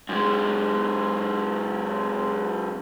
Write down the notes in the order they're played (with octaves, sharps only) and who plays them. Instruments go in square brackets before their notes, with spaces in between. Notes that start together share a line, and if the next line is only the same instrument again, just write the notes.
[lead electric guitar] F#2 G#3